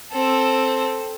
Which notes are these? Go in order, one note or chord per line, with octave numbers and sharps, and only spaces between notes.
C4 A4